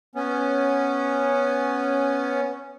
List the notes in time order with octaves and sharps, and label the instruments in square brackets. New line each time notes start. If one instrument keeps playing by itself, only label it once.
[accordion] B3 C#4